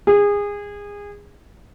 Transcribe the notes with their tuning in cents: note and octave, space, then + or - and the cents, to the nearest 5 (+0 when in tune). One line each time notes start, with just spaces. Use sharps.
G#4 -25